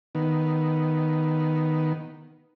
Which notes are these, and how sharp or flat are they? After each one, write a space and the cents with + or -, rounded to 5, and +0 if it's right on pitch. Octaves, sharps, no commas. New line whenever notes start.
D#3 +0 B3 +0